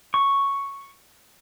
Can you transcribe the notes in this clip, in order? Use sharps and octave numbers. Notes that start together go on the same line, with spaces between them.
C#6